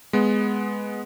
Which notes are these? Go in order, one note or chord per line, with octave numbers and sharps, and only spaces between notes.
G#3 B3